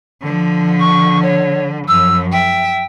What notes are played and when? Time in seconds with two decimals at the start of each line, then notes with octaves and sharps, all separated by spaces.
0.22 D3 F3
0.80 C#6
1.22 C#5
1.88 F#2 F3 E6
2.32 E5 G5